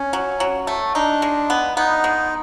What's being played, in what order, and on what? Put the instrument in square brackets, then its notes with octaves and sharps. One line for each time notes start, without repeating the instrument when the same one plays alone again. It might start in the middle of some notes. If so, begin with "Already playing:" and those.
Already playing: [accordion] C#4
[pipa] F#3
F#3
A3
[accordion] D4 [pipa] D#4
[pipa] G#3
B3
[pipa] B3 [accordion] D#4
[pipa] G#3